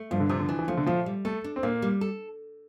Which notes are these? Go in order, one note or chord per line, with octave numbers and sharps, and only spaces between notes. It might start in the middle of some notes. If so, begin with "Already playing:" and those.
Already playing: A3
G2 F3
D3
C3 F3
D3
E3 D4
E3
F3 A3
D3
A#2 F3
G3
A3 A4
D4
C4
A#2 A#3
G3
A4